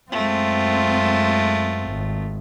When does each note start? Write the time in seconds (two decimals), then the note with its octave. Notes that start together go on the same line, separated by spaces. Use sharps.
0.11 F#2 G#3 A3 C4 F4
1.88 G#1